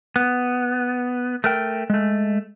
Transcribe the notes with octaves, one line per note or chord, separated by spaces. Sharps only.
B3
A3 A#4 G5
G#3 A3